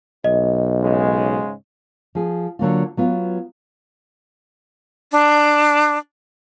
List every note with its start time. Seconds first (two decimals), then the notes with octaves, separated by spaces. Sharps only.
0.24 B1 D#5
0.82 G#2 C#3 G#3
2.15 F3 G#4
2.59 D3 F#3 A#3 F4
2.97 F#3 B3 F4
5.12 D4